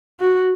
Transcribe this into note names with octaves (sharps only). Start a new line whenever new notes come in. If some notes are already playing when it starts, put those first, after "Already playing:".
F#4